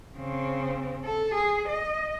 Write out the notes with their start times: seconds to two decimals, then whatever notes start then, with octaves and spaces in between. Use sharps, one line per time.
0.17 C#3 C4
1.04 A4
1.35 G#4
1.68 D#5